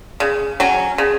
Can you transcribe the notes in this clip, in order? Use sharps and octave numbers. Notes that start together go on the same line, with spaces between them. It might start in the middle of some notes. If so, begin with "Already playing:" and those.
C#3
F#3 C#4
C#3